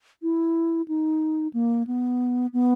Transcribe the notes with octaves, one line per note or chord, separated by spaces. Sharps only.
E4
D#4
A#3
B3
B3